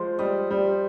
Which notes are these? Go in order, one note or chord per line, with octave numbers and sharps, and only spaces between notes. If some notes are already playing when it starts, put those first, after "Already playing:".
Already playing: F3 G#3 C5
G3 D#5
G3